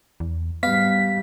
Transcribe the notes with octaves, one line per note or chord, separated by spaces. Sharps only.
E2
G#2 G3 B3 F5 B6